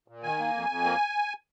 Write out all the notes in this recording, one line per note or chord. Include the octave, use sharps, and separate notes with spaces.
A#2
D#3 G#5
A#3
F2
F2
A#3